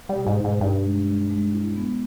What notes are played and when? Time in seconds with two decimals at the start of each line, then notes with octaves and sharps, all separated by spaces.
0.09 G3
0.16 B2
0.26 G#2
0.38 D#4
0.44 G#2
0.61 G2 D#4
0.84 G#3
1.07 G#3
1.30 G#3
1.54 E4
1.76 B3